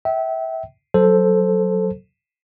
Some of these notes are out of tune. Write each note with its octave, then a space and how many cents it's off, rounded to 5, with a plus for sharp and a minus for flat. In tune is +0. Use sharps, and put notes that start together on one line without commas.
E5 -20 G5 -30
F#3 +0 A4 +0 C5 +0